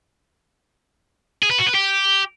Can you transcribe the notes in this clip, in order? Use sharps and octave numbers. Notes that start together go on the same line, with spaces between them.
G#4
B4
F#4
B4
G4